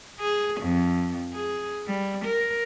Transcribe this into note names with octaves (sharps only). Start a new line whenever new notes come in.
G#4
F2
G#4
G3
A#4